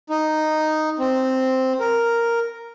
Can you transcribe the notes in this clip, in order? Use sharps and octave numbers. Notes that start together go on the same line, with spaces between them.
D#4
C4
A#4